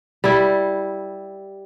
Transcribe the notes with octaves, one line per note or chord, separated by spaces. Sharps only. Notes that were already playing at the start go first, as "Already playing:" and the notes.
G3 E4